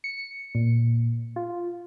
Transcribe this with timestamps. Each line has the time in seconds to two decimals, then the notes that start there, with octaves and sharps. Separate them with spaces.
0.04 C#7
0.55 A#2
1.36 F4